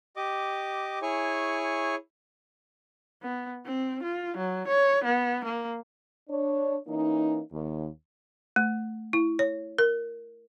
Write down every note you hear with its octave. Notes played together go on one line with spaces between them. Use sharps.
G4 D#5 D6
E4 G#4 C#5 G#5 C#6
B3
C4
F4
F#3
C#5
B3
A#3
D4 C#5
E3 A#3 C#4 D#4
D#2
A3
E4
C#5
A#4